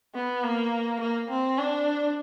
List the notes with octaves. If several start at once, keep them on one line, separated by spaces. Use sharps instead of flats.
B3
A#3
A#3
C4
D4